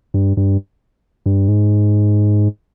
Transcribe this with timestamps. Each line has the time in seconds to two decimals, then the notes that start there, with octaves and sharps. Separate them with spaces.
0.14 G2
0.37 G2
1.26 G2
1.48 G#2